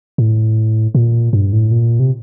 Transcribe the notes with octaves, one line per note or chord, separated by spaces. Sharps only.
A2
A#2
G2
A2
A#2
C3